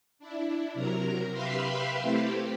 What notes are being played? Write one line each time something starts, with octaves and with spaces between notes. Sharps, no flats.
D4 E4
C3 F#3 A#4 A#5
G4 B4 E5 F5 B5 C6
A3 C4 E4 G4